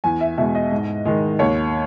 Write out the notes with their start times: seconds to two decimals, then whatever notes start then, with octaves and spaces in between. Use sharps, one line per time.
0.04 E2 G#5
0.21 E5
0.38 B2 G#3 E5
0.55 D#5
0.71 G#2
1.05 D#3 G#3
1.39 D#2 C#5